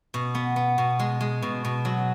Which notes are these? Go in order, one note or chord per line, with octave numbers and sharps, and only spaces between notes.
B2
B3
B3
B2
G#3
G#3
B2
B2
F#3